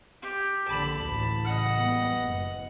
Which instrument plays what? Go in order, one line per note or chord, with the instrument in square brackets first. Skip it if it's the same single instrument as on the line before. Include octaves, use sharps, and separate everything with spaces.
[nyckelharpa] G4
[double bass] A#1 D3 [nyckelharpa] A5 B5
[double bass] A1 D2
[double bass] A1 C#3 [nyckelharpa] D#5 F#5
[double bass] G3 B3
F#1